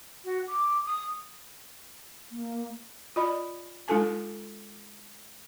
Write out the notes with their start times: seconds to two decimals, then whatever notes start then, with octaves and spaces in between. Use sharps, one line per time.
0.24 F#4
0.47 D6
0.85 D#6
2.31 A#3
3.16 F4 D5 D#5 B5
3.88 G#3 D#4 F4 A4 G#5 A5